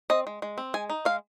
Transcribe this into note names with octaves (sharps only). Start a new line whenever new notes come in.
C4 D#5
G#3
G#3
C4
G#3 G#5
D#4
G#3 F5